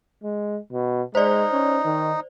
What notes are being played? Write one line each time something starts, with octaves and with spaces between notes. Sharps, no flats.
G#3
B2
G#3 D#4 C5 D5
C#4
D#3